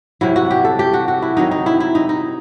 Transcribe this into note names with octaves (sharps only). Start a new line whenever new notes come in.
C3 F#3 E4
F#4
G4
A4
G4
F#4
F#4
E4
C3 D#3 F#3 D#4
D#4
E4
E4
D#4
D#4